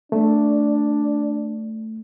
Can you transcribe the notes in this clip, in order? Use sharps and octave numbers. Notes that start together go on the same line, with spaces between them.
A3 D4